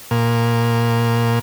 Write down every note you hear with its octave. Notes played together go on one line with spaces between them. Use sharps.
A#2